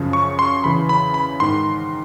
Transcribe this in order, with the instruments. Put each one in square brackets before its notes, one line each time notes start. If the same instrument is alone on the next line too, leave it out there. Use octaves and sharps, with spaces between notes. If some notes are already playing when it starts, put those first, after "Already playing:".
Already playing: [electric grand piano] F#2 C#3 F3
C#6
C6
E2 C#3 E3 B5
B5
B5
G#2 D#3 C6